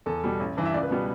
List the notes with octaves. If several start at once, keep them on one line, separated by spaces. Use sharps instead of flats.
E2 A4
B2 G3
A1
G2 E3
E5
C#2 D5
B4
B2 G3 B3